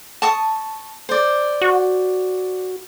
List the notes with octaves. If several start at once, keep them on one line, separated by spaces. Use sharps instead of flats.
A5 C#6 D#6
C5 D5
F#4